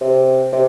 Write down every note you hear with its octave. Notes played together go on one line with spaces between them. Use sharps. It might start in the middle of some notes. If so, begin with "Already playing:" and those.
C3
C3